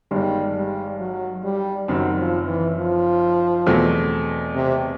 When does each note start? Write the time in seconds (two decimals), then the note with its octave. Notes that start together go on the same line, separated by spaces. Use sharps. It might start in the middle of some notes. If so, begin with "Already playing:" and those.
0.11 G1 G2 D#3 G3 G#3
0.55 G3
1.00 F#3
1.44 G3
1.88 F#1 F#2 D#3 F#3 G3 C4
2.18 F3
2.48 E3
2.77 F3
3.66 E2 B2 F#3 A3 C4
4.55 C3